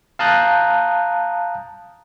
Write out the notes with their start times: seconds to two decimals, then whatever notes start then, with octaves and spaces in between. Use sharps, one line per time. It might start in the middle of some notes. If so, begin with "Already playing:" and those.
0.19 F5 A5 A#5 D#6 F#6 G6